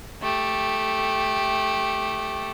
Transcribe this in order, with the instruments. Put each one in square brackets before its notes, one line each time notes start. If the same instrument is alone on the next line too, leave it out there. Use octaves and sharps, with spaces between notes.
[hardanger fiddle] A3 G4